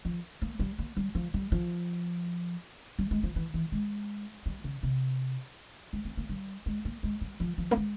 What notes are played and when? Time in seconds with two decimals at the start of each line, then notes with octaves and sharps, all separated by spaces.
0.05 F3
0.42 A#3
0.59 G3
0.79 A#3
0.97 G3
1.15 F3
1.34 G3
1.52 F3
2.99 G3
3.11 G#3
3.23 F3
3.36 E3
3.54 E3
3.72 G#3
4.46 G3
4.64 C#3
4.83 C3
5.93 G#3
6.05 C4
6.17 A#3
6.29 G3
6.66 G#3
6.85 A#3
7.03 G#3
7.21 G3
7.40 F3
7.58 F3
7.71 A#3
7.77 G#3